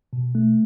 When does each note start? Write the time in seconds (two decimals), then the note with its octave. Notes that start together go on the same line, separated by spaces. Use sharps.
0.13 B2
0.35 A3